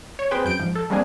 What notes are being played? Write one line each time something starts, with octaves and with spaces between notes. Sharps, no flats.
C#5
C4 G#4 B4 C5 G5
F#2 G6 D7
G#2 F3
A4
G3 G#3 A#3 C4 D4 G#4